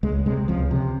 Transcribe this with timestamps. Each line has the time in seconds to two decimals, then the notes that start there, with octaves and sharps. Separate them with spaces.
0.03 C#2 G#3
0.26 C3 G#3
0.48 C#2 F3
0.71 C3